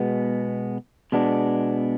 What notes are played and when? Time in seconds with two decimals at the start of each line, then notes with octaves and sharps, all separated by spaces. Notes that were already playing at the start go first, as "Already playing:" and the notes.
Already playing: B2 G#3 B3
1.12 B2 G#3 B3 D4